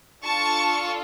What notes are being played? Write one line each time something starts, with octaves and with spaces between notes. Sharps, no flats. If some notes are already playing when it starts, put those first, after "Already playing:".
D4 F4 A4 A5 C#6